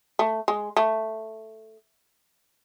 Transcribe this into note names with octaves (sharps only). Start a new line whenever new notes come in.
A3
G#3
A3